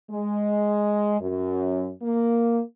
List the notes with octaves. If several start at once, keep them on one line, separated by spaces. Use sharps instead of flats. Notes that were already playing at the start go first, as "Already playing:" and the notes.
G#3
F#2
A#3